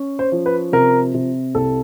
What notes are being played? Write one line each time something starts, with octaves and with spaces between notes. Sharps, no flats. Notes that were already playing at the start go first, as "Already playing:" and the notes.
Already playing: C#4
C5
F3
B4
C3 A#4
C3
C2 A4